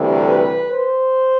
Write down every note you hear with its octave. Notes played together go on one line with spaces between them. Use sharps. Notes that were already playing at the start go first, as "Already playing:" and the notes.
Already playing: D2 C3 E3 G3 A4
B4
C5